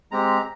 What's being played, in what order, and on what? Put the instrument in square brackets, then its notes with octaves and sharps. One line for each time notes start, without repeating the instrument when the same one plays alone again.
[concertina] G#3 C4 G4 A#5